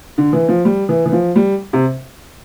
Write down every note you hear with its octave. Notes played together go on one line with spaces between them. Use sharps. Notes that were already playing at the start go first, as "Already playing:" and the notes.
D3
E3
F3
G3
E3
E3
F3
G3
C3